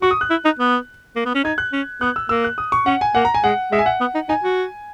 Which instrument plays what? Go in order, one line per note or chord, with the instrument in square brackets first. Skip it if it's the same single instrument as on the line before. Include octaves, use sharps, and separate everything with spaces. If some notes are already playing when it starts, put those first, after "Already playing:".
[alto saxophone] F#4 [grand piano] C#6
[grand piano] D#6
F#6
[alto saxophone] E4
D#4
B3
A#3
B3
C#4
[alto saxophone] D#4 [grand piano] G#6
[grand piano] F#6
[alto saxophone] C#4
[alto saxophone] B3 [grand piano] F#6
[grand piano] E6
[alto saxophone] A#3 [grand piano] E6
[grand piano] F#6
D#6
C#6
[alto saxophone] C#4 [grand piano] F#5
[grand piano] G#5
[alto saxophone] A#3 [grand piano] F#5
[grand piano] A#5
G#5
[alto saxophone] G#3 [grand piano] F#5
[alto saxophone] G#3 [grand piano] E5
[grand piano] G#5
F#5
[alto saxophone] B3
D#4
[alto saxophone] D#4 [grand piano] G#5
[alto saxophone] F#4